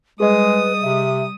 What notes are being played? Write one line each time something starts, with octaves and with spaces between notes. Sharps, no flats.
G3 G#3 G#4 B4 D#5 D#6
C3 E5